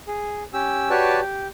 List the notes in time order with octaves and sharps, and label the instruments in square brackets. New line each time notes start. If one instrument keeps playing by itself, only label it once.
[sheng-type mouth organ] G#4
C#4 G4 E6
F#4 G4 B4 C#5 D5 A5
G4